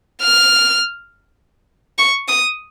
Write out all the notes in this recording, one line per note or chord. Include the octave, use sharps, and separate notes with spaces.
F6
C#6
D#6